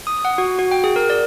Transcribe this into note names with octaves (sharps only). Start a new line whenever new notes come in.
D#6
F#5
F#4
F#4
G5
G#4
A#4
D5